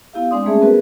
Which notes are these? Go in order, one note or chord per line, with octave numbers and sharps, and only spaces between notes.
B3 E4 G4 F5
G#3 C4 D4 D5 C6 D#6
G3 A3 A#3 C#4 G#4 E5
B3 F#4 G#4 A#4 B4